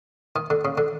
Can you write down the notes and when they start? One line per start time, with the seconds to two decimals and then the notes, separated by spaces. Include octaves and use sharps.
0.36 D#3
0.50 D3
0.65 C#3
0.78 D3